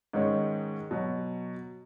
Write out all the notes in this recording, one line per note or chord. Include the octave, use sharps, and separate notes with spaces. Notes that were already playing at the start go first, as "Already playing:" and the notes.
G#2 D#3 G#3 C#4
B2 F#3